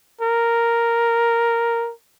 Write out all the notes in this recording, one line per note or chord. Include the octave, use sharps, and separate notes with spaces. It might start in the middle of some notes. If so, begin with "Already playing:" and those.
A#4